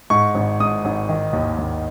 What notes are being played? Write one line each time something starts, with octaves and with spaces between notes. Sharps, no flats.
G#2 C#6
G#1
G#2 D#6
G#1
D#3
D#2
D#2